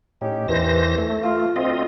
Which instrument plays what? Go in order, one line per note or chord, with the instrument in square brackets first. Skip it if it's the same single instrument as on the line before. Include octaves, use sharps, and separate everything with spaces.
[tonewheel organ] A2 [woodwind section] C#4 D#4 G4
[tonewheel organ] E2 C5 A#6 [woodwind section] G2 D#3 E3
[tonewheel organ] A3
[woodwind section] F4
[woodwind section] D2 [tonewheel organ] C4 F4 D#5